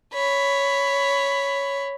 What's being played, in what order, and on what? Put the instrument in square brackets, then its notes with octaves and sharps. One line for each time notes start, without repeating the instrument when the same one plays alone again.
[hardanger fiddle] C#5 B5